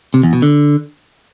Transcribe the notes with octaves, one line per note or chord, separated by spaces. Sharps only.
C3
E2
B2
D3